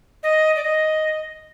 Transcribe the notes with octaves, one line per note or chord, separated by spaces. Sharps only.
D#5
D5
D#5